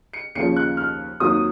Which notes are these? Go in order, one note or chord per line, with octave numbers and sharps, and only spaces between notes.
C#7
D#2 C#3 F3 C#7
F#6
F6
D#2 D#3 F#3 C4 D#6